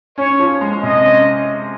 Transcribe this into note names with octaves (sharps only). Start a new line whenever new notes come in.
C#4 C#5
F3
G#3
C3 D#5
C#4